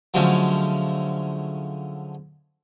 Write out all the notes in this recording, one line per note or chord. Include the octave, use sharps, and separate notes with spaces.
D3 F3 F#3 G#3 A3 C#4